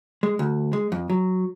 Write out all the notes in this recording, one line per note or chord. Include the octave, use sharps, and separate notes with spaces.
G#3
D2
G#3
F2
F#3